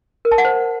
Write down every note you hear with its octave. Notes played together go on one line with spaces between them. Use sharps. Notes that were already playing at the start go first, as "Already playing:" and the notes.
A#4
A5
F#5
C5